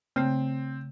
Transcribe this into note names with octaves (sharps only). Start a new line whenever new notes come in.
C#3 A3 C4